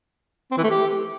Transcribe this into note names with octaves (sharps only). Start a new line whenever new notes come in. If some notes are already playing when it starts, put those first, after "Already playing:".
C4
E3
A3
G4